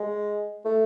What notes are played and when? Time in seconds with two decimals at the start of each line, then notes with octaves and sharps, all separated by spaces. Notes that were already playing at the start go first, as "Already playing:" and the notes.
Already playing: G#3
0.65 A3